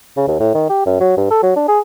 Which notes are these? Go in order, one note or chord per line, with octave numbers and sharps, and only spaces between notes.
C#3
D#2
A2
D#3
G4
F#2
F#3
G2
A4
F#3
D4
G#4